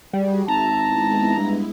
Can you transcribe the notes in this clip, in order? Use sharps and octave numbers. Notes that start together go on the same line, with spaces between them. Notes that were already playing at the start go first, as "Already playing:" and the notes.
G3 F#4 G#4
G#1 E5 A5 A#5
G#3 B3 E4
G2